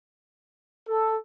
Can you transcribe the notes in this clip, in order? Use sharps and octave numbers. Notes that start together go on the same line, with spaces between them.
A4